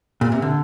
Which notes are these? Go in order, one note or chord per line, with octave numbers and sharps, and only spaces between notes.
A#2
C3
D3